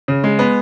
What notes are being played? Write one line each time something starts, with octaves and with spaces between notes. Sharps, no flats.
C#3
G#3
B3